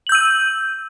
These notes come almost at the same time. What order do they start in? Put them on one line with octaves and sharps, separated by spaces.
F#7 G6 E6 D#7